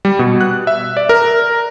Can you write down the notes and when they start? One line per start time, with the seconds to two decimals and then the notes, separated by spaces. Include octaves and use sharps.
0.05 G3
0.19 B2
0.41 F#6
0.67 E5
0.97 D5
1.09 A#4